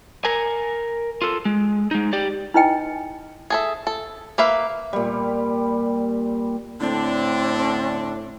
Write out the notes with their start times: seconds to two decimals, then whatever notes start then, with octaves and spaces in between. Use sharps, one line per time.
0.25 A#4 G#5
1.22 F4 A4
1.45 G#3
1.91 G#3 D#4
2.13 G4 D5
2.54 D#4 E4 B4 D#5 G5 G#5
3.50 G#4 A4 E5
3.87 A4
4.38 A#3 B4 E5 F5
4.93 A#2 G3
6.81 A2 D3 C4 D4